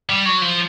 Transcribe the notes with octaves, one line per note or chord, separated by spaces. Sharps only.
G3
F#3
F3